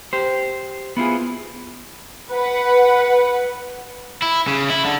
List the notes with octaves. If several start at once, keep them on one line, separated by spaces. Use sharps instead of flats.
G4 C5
B3 E4 F4 G#4
B4 F#5
E4
C#3
E4
D3